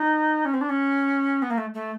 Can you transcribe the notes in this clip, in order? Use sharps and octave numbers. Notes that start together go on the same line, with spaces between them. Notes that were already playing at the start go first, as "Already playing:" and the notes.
Already playing: D#4
C#4
C4
D4
C#4
B3
A#3
A3
A3